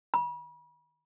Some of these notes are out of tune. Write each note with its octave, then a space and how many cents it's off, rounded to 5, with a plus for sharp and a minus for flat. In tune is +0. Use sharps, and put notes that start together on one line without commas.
B5 -40